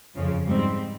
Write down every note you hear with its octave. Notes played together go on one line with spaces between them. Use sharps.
F2 C#3 F3
G#2 G3 C4